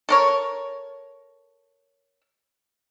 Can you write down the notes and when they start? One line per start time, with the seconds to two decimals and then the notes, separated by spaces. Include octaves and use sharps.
0.09 A4 A#4 C#5